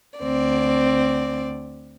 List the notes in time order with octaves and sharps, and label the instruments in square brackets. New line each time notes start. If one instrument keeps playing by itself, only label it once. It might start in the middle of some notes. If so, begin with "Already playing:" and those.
[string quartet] D2 C4 D5